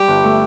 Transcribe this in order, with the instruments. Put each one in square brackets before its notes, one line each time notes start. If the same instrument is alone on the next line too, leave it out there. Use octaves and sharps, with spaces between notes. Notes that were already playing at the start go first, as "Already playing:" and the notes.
Already playing: [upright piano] G3 [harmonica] G4
[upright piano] G1
A3